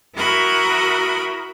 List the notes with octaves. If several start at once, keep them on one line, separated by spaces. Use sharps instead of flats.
E4 F#4 A#4 B5 D#6